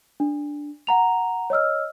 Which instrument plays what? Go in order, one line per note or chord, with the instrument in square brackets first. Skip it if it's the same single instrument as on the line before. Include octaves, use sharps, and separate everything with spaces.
[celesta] D4
F#5 A#5 F7
C#5 D#5 E6 F6